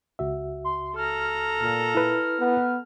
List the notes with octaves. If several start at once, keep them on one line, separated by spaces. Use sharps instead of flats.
C#2 F#4 E5
C6
A4 A#5 F6
A#2
E4 B4
B3